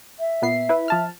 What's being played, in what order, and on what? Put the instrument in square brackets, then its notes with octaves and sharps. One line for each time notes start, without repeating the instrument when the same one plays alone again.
[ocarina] E5
[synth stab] A#2 B3 C7
E4 B4
F3 A5 F6